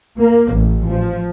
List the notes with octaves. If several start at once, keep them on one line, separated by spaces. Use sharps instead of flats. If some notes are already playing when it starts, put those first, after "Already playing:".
A#3
A1
F3